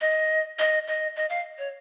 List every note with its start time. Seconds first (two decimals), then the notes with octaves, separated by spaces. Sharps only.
0.01 D#5
0.59 D#5
0.87 D#5
1.16 D#5
1.30 F5
1.58 C#5